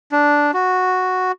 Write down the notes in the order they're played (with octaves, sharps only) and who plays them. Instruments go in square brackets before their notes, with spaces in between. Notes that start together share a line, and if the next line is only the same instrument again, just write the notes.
[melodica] D4
F#4